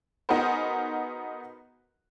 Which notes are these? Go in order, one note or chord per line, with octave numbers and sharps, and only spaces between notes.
B3 D#4 F#4 G#4 A#4 C5